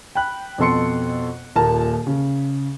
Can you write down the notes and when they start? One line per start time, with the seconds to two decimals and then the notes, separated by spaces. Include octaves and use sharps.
0.15 G5 B5 F#6
0.58 F2 B2 A4 C6 C#7
1.56 D#1 A#2 A#4 A5
2.07 C#3